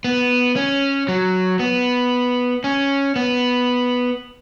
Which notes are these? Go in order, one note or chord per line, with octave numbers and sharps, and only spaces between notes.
B3
C#4
F#3
B3
C#4
B3